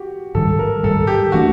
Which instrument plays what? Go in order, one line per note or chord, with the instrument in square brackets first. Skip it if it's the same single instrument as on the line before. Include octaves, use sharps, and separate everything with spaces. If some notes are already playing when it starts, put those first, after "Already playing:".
Already playing: [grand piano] F#4 G4
[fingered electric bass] G#2 D#3 G3 [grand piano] A4
[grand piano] A#4
[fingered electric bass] G#2 D#3 G3 [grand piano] A4
[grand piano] G4
[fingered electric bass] E3 A3 D4 [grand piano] F#4